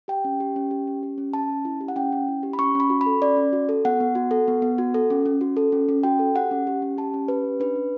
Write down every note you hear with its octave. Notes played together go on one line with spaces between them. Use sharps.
G4 G5
C#4
G4
C#4
G4
C#4
G4
C#4
C#4 A5
C#4
E4
G4
F#5
C#4 G5
C#4
E4
G4
B5
C#4 C#6
C#4
B5
F#4
B5
A4
C#4 D5
C#4
F#4
A4
B3 F#5
B3
F#4
A4
B3
B3
F#4
A4
C#4
C#4
F#4
A4
C#4
C#4
F#4 G5
A4
G4 F#5
C#4
G4
C#4
G4 A5
C#4
G4 B4
C#4
D4 B4
D4